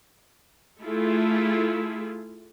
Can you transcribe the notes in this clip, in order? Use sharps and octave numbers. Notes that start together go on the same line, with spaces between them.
A3 E4 F4 G#4 A4